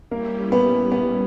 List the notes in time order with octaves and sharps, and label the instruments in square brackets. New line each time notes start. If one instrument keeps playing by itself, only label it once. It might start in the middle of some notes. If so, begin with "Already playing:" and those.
[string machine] G3 C#4 E4 G4 [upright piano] A#3 A#4
[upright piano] B3 B4
B3 B4